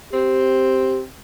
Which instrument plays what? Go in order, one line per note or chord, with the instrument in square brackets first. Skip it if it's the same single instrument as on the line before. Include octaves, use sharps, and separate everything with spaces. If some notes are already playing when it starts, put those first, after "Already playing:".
[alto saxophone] C4 [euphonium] G4